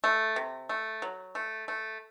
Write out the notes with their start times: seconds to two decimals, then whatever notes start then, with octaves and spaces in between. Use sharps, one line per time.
0.04 A3
0.36 C3
0.69 A3
1.02 F#3
1.35 A3
1.68 A3